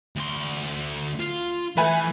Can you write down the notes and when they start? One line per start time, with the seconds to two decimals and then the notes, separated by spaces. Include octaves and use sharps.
0.16 D2 C6
1.19 F4
1.77 E3 A3 B4 G#5